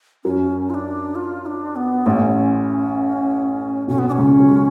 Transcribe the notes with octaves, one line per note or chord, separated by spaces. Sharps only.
F#2 F#3 C#4
F4
D4
F4
D4
B3
A1 A2 C#4 D4
B1 B2 C#4
B3
D4
C#4
C#2 C#3
F#3
G#3